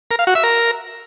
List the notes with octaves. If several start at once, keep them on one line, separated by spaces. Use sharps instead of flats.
A#4
F5
F#4
E5
A#4